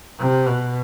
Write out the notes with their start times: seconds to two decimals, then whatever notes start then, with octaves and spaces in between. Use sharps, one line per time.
0.19 C3
0.47 B2